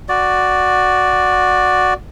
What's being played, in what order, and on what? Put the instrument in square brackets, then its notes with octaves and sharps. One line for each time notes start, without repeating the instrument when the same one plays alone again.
[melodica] F#4 D5